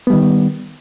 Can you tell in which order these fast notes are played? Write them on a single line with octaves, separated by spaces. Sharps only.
B3 G3 D#3